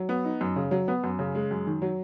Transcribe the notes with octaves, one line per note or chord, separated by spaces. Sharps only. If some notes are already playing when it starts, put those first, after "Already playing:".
Already playing: F#3
B3
D#4
F#2
C#3
F#3
B3
F#2
C#3
G#3
F#2
D#3
F#3